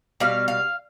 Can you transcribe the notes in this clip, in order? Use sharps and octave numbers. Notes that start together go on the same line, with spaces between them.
B2 G3 F5
F5